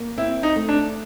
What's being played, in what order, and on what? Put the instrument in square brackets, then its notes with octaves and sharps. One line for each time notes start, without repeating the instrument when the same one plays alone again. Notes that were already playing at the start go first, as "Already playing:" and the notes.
Already playing: [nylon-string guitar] A#3
[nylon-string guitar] C4 [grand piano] E4
[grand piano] D#4
[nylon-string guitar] A3
[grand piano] D4